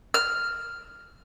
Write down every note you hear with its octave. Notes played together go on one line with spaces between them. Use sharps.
F6